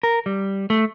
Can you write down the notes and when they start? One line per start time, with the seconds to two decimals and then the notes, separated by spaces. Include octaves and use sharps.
0.03 A#4
0.26 G3
0.70 A3